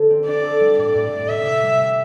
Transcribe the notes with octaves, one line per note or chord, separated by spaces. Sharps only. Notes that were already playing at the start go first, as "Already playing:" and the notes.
Already playing: D3 A4 C5
C4
D4 D5
A4
G3
A2 D5
A2
A2
C3 E5
C3
G3
C3